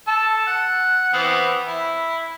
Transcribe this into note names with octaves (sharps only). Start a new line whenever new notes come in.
A4 A5 E6
F#5
E3 B3 C4
E4